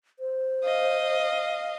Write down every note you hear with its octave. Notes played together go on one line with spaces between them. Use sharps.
C5
D#5 F5